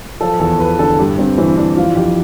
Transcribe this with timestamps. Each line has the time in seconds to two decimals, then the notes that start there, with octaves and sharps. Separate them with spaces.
0.21 F3 A4
0.40 E2 A4
0.60 E2 B4
0.79 D3 A4
0.99 G2 G4
1.18 G2 C4
1.38 E3 C4
1.57 E3 D4
1.77 F3 F4
1.96 F2 G4